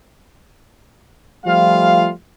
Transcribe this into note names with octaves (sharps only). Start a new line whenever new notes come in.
F3 G3 A3 F4 F5